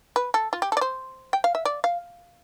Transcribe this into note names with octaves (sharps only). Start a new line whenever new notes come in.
B4
A4
F4
G4
A4
D5
C5
G5
F5
E5
D5
F5